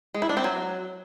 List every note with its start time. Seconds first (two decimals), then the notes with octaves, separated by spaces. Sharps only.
0.14 G#3
0.22 E4
0.29 D4
0.37 C4
0.44 F#3